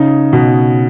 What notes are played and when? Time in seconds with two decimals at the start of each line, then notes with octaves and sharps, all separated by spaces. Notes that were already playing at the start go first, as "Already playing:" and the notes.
Already playing: C#3 D#4
0.33 B2